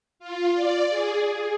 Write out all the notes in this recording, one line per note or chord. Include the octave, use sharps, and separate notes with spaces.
F4
D5
G#4